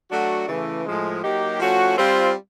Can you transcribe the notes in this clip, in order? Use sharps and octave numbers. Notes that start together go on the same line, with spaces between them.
F#3 A3 D4 F#4
C#3 E3 A3
A2 F3 G#3
F#3 A#3 D#4 G4
F3 A3 C#4 F#4
G3 C4 F4